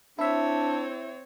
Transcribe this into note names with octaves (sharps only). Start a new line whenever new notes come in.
C4 D4 E4 C#5 E5